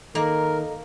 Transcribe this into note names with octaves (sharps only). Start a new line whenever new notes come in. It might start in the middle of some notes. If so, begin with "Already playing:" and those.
D#3 A#3 A4 A#4 D#5 A#5